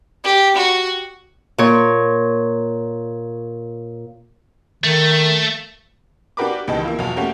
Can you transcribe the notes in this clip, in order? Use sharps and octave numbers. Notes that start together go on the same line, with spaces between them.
G4
F#4
A#2 C#5
D#3 A3
D4 F#4 G4 A#4 B4 D6
C#2 D#3 E3 G4 D#5 A5
A#3 E4 F4
E2 B2 F#3 F4 A5 F7
A3 A#3 C#4 F#4 G4 A#4